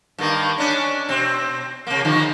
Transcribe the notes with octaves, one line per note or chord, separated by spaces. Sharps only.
G2 D#3 A#3
C#4 D4
B2 C4
C3 A#3
D3 D#3 F3